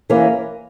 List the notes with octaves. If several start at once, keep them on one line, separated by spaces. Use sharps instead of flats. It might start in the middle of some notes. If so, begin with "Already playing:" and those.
E3 A#3 C#4